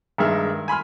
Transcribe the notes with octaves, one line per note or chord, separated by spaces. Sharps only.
G2 D#3 G#3 E5 F6
G#5 B5 C6 F6